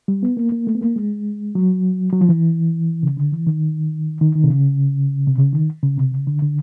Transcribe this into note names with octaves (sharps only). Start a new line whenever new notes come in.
G3
B3
A#3
A#3
A3
B3
A#3
G#3
F#3
F#3
F3
E3
C#3
D3
E3
D#3
D#3
D#3
C3
C#3
C3
C#3
D#3
C#3
C3
C#3
D3
D3